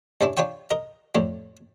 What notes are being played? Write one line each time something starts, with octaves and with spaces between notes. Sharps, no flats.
G2 C#4 D4 E4
D4 F4 C#5 G5 C#6
A#4 D#5
F2 A2 D4